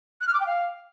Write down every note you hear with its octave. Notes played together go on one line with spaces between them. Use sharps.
F#6
F6
D6
G5
F5